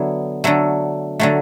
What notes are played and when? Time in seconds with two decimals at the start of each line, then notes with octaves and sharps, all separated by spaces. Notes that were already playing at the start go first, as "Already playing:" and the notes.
Already playing: D3 F#3 B3 E4
0.44 D3 F#3 A3
1.20 D3 F#3 A3